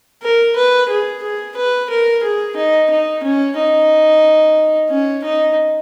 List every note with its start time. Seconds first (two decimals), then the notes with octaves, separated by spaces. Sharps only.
0.22 A#4
0.56 B4
0.89 G#4
1.23 G#4
1.57 B4
1.90 A#4
2.23 G#4
2.57 D#4
2.90 D#4
3.23 C#4
3.57 D#4
4.90 C#4
5.24 D#4